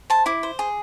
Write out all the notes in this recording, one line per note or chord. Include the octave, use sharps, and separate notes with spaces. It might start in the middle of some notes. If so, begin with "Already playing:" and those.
C5 A5
E4 D6
C5
G#4